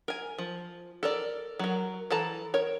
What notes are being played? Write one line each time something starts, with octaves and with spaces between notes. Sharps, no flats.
A#4 G#5
F3
A4 A#4 D5
F#3 A#4
E3 A4 A5 A#5
A#4 C#5